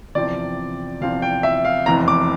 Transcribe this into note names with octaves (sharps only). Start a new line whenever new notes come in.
E2 C3 F3 C4 D5
E2 C3 F3 C4 F5
G5
E5
F5
F1 E2 C3 E3 A#5
D6